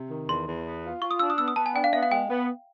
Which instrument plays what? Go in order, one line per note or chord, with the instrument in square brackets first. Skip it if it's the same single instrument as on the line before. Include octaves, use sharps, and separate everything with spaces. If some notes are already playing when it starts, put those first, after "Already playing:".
Already playing: [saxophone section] C3
D#3
[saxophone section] E2 [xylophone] C6
[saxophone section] E2
B3
F4
[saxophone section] F4 [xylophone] C#6
[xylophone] D#6
[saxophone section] D4 [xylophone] E6
[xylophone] D#6
[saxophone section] B3 [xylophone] E6
[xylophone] D#6
[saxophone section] B3 [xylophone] A5
[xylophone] G#5
[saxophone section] D4 [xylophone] G5
[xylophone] F5
[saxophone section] B3 [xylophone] E5
[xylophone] F5
[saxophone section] G#3 [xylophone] G5
[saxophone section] B3